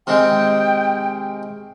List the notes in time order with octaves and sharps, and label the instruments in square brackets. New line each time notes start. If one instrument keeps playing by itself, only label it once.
[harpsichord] C3 D#3 G#3 [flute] G5